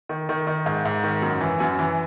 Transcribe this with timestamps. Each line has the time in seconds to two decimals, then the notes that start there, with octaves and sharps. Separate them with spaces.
0.09 D#3
0.29 D#3
0.47 D#3
0.66 G#2
0.85 G#2
1.04 D#3
1.22 F#2
1.41 E3
1.59 F#2 G#5
1.79 E3